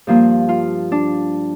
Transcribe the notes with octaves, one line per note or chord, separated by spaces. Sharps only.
G2 F3 A#3
F4
D4